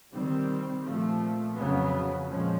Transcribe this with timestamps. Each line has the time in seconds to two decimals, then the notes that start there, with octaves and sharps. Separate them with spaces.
0.13 C3 D#3 G3 C4
0.85 A#2 F3 A3
1.55 F2 C#3 F#3 B3
2.27 A#2 F3 G#3 C#4